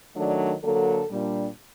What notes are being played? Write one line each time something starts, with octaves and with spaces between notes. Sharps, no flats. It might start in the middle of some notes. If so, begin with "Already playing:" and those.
D#3 F#3 A3 D4 D5
D3 F#3 A#3 A4
A#2 G3 D4